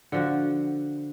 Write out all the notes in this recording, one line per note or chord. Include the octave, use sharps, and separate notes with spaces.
D3 F3 F#4